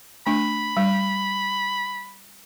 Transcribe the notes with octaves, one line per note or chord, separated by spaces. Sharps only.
A3 D4 B5
G3